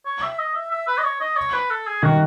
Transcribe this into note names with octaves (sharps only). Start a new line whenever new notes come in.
C#5
E5
D#5
E5
E5
B4
D#5
C#5
D#5
C#5
B4
A4
G#4
D#3 F#4